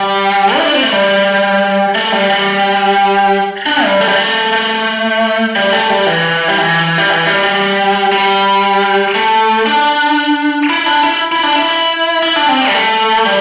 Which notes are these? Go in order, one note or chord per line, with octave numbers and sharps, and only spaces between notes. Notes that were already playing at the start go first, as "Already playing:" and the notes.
Already playing: G3
E4
D4
C4
A3
G3
A3
G3
G3
D4
G3
A3
G3
A3
A3
G3
A3
G3
E3
G3
E3
G3
E3
G3
G3
G3
A3
D4
E4
D4
E4
E4
D4
E4
E4
D4
C4
D4
G3
A3
G3